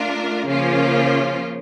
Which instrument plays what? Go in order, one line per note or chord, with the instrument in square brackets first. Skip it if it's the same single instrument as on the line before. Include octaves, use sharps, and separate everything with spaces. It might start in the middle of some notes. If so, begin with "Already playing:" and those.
Already playing: [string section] A3 D4 F4 A#4
C#3 F3 A#3 C#4 F4